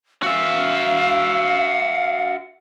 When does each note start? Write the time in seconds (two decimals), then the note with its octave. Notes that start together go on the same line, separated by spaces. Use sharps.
0.23 F#4 E5 F5